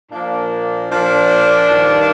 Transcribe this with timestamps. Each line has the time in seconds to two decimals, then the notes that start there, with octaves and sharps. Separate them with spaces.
0.11 A#2 F3 A#3 D4
0.91 A#2 F3 A#3 D4
1.70 G2 D#3